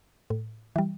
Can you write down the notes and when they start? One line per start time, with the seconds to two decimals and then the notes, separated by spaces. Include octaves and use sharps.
0.30 A2
0.76 E3 G3